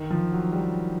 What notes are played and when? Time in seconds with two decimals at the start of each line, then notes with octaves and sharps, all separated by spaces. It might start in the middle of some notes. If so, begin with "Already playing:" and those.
Already playing: D#3
0.11 F3
0.32 F#3
0.52 G3